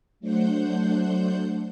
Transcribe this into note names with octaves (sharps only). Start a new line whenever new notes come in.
F#3 A3 D4 C5 F#5 G6